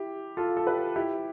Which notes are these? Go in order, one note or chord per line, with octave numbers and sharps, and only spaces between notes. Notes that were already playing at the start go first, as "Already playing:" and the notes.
Already playing: E4 G4
F4 A4
A4
G4 B4
E4 G4